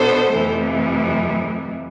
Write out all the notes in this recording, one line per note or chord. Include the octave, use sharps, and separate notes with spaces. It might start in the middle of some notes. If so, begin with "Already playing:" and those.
Already playing: B2 B3 D4 A4 C5
F2 C3 E3 A3